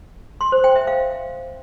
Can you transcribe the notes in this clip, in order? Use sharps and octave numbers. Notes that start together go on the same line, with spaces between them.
C6
C5
G5
E5
F5